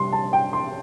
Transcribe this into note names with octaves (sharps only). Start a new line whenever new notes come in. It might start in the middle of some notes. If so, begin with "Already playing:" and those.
Already playing: C3 G3 C4 C6
A5
G5
C6